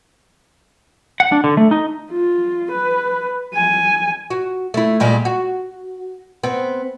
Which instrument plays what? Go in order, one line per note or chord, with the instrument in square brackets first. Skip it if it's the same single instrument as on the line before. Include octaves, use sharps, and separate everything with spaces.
[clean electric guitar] F#5
D4
D3
A3
D#4
[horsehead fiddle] F4
B4
G#5
[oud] F#4
A3 E4
A#2 G3 G#3
F#4
B3 C4